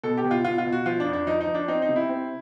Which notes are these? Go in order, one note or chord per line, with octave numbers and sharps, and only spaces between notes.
B2 A4
G4
B2
F4
B2 F4
F4
B2
F#4
F3 F4
D4
F2
D4
F3 D#4
D#4
F3
D4
C4 D#4
D#4
C3
E4
C4